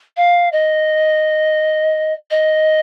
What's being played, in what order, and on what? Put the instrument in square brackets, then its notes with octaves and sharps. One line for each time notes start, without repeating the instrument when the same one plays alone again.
[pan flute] F5
D#5
D#5